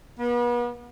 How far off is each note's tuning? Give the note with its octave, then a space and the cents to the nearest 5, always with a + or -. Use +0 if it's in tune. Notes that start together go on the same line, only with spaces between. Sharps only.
B3 -40